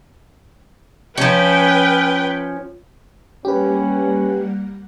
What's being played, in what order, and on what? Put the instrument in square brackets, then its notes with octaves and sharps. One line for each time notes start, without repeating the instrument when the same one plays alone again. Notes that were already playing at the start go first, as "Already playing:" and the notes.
[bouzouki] F3 C#4 [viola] B4 G5
[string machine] G3 A#3 F#5 [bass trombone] C#4 [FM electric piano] G4 B4